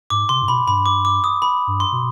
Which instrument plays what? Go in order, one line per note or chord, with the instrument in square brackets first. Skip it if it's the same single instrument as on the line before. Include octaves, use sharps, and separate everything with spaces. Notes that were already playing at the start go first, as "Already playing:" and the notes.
[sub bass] G#2 [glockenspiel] D6
[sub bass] C3 [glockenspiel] C6
[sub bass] G#2
[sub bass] B2 [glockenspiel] B5
[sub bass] G2 [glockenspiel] B5
[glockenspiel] D6
D6
D#6
B5
[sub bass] G2
[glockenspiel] C6
[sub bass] B2